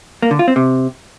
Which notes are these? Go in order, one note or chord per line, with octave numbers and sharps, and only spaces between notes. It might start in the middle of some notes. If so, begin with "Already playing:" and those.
A#3
D3
F4
C4
C3